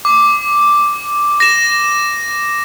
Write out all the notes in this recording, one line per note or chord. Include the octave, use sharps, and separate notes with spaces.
D6
A#6 E7